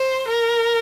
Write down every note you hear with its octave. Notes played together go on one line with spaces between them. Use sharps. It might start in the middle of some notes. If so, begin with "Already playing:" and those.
Already playing: C5
A#4